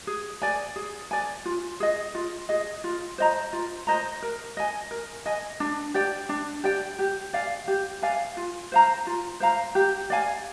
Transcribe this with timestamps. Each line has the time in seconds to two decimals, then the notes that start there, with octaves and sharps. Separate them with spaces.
0.07 G#4
0.42 D5 G#5
0.76 G#4
1.11 D5 G#5
1.45 F4
1.80 G#4 D#5
2.15 F4
2.49 G#4 D#5
2.84 F4
3.18 C5 D#5 A#5
3.53 F4
3.87 C5 D#5 A#5
4.22 A#4
4.57 D#5 G#5
4.91 A#4
5.26 D#5 G#5
5.60 D4
5.94 G4 D5 G5
6.29 D4
6.64 G4 D5 G5
6.99 G4
7.33 D5 F5 G#5
7.68 G4
8.02 D5 F5 G#5
8.37 F4
8.72 C5 F5 A#5
9.07 F4
9.40 C5 F5 A#5
9.75 G4
10.10 D5 F5 G#5